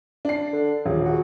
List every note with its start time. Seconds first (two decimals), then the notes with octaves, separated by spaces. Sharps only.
0.25 D4 C7
0.53 D3
0.85 D#1 C#3
1.05 F#4